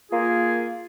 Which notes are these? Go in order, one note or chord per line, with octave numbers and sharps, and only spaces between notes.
A#3 F4 G#4